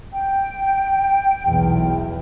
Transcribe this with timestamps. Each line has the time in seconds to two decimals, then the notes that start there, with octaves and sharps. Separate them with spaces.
0.12 G5
1.45 B1 E2